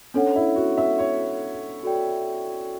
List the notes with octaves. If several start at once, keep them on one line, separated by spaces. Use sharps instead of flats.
C#4 D4 A4 C#5 F#5
E4
F#4
E5
C#5
F#4 A4 D5 G5